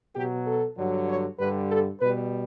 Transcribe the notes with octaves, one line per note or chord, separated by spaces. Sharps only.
B2 F#3 G4
A4
G2 D3 F#3
C#5
G2 D3 G3 B4
A4
B2 G3 B4